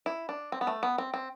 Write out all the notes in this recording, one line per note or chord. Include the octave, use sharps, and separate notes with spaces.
E4
D4
C4
B3
A3
B3
C4
C4